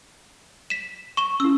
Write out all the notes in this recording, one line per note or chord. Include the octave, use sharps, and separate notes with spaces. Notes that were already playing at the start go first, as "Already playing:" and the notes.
B6 E7
C#6 E7 G7
C#4 E4 E6